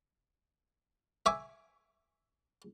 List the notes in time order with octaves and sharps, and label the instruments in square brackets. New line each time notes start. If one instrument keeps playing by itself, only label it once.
[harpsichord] E5 G#5 C#6 D6